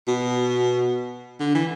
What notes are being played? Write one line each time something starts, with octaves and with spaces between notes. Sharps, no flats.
B2
D3
E3